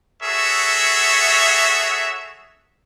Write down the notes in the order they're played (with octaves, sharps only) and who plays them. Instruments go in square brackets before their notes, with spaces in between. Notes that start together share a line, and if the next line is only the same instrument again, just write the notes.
[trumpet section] F#4 G#4 A4 C#5 E5